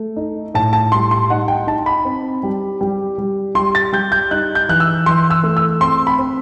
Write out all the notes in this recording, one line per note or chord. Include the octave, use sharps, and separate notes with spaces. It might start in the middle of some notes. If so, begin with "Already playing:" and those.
Already playing: A3
D#4
A2 A5
A5
G3 C6
C6
D#4 F#5
G5
D#4 A5
B5
C4
G3
G3
G3
G3 C6
A6
G3 G6
G6
D#4 F#6
G6
E3 F#6
E6
E3 C6
E6
A3
E6
C4 C6
B5
C4